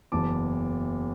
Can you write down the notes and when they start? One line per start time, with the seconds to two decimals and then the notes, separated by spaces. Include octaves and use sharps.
0.12 F#1 E2 E3 A5 D6